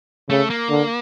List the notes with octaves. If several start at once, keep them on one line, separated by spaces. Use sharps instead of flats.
C#3 A3
A#3
D3